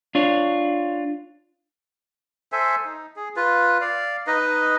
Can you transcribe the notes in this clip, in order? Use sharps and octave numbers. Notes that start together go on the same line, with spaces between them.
D4 F4 C#5
A4 C5 E5 G#5
D#4
G#4
F4 B4
D5 F5
D#4 B4 D#5